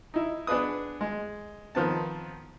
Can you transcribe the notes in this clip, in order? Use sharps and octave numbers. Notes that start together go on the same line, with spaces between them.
D#4 E4
B3 D4 G#4 B4 D#6
G#3
D#3 F3 B3 C4 A5